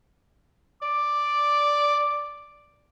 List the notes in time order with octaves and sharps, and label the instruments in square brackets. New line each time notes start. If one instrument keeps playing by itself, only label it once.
[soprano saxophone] D5 [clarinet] D6